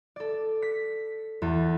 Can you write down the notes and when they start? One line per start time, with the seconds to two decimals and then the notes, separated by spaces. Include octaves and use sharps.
0.16 A4 D5
0.62 B6
1.42 E2 A4